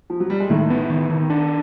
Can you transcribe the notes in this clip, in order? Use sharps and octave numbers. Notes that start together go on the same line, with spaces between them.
F3
F#3
G3
G#3
A2 D#3 A3
B3
D#3
D#3
D4